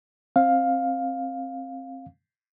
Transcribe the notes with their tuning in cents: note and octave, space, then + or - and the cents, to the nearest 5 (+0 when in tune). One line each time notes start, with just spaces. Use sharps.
C4 +25 F5 +10